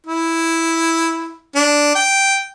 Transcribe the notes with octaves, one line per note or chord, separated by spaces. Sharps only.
E4
D4
G5